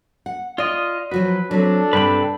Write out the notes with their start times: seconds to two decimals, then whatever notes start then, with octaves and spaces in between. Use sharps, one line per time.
0.26 F#5
0.58 F4 D5 D#5
1.11 F3 F#3 F#4 B4
1.51 F#3 C4 D4 A4
1.93 G2 C3 B4 G5 B5